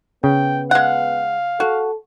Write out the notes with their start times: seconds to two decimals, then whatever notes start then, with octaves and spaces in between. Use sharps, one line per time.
0.24 C#3 B3 G5
0.71 G#3 F5 F#5
1.60 F#4 A4